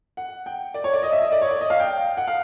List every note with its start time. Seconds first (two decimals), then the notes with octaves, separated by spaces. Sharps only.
0.17 F#5
0.46 G5
0.74 D5
0.84 C#5
0.93 D5
1.03 D#5
1.13 E5
1.22 D#5
1.32 D5
1.42 C#5
1.51 D5
1.61 D#5
1.70 F5
1.80 G5
2.17 F#5
2.28 F5